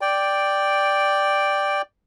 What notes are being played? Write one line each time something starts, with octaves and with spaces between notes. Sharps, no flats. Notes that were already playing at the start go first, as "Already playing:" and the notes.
D5 G5